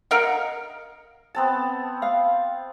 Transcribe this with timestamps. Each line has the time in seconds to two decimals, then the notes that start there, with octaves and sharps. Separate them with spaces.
0.11 A#4 D#5 F5 F#5
1.35 B3 C4 A5
2.02 F5